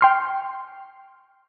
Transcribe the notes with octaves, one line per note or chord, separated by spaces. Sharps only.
G5 C6 F6